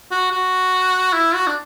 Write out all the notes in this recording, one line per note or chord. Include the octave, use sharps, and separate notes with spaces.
F#4
F#4
E4
F#4
D4